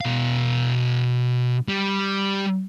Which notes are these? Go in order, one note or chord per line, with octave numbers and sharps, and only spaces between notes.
B2 F5
G3